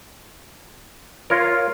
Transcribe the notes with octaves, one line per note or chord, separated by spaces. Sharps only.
F4 A#4 C#5